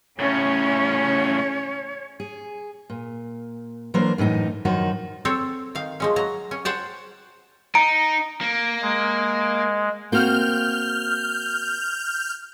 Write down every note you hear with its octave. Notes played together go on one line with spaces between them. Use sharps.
A2 C#3 C#4 C#5
G#4
A#2
E3 F#3 A#3 D4 A#4 C5
F#2 A2 E3 D#4
F#2 D#3 F3 D#4 F#4
C4 A4 C#5
D#3 F5
F3 G#3 C#4
F#3 A#5
C#4
C5 C#5 F#5 G5 A5
D#4 A#5 D7
A#3
G#3
A#3 C4 F#4 F6 G6